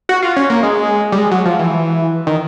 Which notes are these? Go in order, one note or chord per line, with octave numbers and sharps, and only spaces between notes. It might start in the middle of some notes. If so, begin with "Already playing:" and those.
F#4
F4
C#4
A#3
G#3
G3
G#3
F#3
F3
E3
D#3